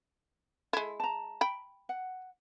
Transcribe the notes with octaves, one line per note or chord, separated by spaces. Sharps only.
G#3 E4 A4
A5 A#5
G5 B5
F#5